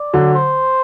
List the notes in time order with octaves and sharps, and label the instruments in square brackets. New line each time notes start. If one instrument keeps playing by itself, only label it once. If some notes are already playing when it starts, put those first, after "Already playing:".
Already playing: [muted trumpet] D5
[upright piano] D3 F#3
[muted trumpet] C5